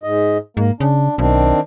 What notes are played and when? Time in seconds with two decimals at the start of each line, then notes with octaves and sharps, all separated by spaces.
0.03 G#2 D#5
0.57 G#2 A#3
0.80 C#3 D4
1.18 B1 D#3 C4 D4